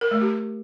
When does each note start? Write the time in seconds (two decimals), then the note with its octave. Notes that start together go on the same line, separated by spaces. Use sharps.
0.01 A#4
0.11 A3
0.21 G4